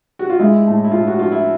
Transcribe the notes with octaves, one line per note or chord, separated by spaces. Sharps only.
F#4
F4
G#3 E4
A2
E4
A2 F4
F#4
F3 F4
E4